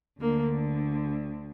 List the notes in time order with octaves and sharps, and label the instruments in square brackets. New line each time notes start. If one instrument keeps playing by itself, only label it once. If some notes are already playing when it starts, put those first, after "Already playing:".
[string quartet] D2 D3 A#3